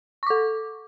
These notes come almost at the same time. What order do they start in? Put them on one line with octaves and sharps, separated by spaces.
C#6 D6 A4